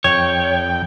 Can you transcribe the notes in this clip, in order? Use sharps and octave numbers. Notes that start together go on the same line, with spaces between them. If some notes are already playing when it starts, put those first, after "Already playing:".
F2 C#5 G5